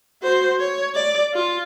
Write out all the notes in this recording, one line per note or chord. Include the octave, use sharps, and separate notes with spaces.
F#4 C5
C#5
D5
F4